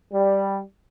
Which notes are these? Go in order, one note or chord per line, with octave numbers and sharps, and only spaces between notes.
G3